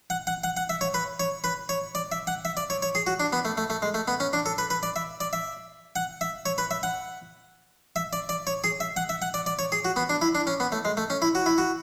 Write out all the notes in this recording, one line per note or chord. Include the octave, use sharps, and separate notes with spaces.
F#5
F#5
F#5
F#5
E5
C#5
B4
C#5
B4
C#5
D5
E5
F#5
E5
D5
C#5
C#5
G#4
F#4
D4
B3
A3
A3
A3
G#3
A3
B3
C#4
D4
A4
B4
B4
D5
E5
D5
E5
F#5
E5
C#5
B4
E5
F#5
E5
D5
D5
C#5
G#4
E5
F#5
E5
F#5
D5
D5
C#5
G#4
F#4
B3
D4
E4
D4
C#4
B3
A3
G#3
A3
C#4
E4
F#4
E4
F#4